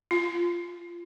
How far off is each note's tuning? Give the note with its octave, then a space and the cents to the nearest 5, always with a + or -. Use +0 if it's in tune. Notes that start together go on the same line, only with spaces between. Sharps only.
F4 -15